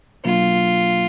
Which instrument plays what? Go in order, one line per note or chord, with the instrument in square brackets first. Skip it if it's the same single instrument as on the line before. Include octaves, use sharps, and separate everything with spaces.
[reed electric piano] B2 F#3 A#3 D4 [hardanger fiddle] F4